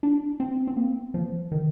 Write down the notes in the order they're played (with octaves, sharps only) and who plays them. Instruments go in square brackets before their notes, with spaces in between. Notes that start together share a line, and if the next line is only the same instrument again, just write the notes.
[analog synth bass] D4
C4
C4
A#3
F3
D#3